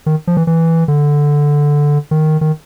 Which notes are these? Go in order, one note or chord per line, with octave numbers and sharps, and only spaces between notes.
D#3
F3
E3
E3
D3
D#3
D#3